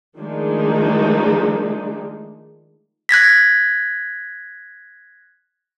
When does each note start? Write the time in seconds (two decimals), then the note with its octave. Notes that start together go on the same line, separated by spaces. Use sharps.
0.19 D#3 F3 G#3 A3 D4 D#4
3.09 F#6 G#6 A#6 B6